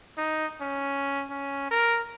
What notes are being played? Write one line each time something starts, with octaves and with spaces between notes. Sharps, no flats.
D#4
C#4
C#4
A#4